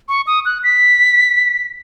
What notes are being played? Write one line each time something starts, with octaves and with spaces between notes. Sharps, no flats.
C#6
D#6
F#6
B6